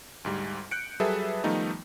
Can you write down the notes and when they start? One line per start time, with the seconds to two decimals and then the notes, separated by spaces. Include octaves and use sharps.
0.24 D2 G#2 G3
0.71 F#6 G6 C#7 D7
1.00 F#3 G3 G#4 A4 B4 E5
1.44 D#3 F3 G3 A3 B3 D#4